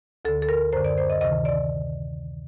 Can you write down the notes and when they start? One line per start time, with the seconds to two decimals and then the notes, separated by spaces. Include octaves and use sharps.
0.25 D2 A4
0.28 D3
0.42 A4
0.49 A#4
0.73 F#2 D3 C5
0.84 D5
0.98 C5
1.10 D#5
1.21 D2 C3 D#3 D#5
1.45 D5